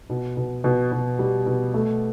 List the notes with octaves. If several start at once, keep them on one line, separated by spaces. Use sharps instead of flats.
B2
B2
B2
B2
G3
B2
A3